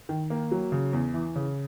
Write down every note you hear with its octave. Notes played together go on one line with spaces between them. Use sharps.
D#3
A#3
F#3
C#3
E2
E3
C#3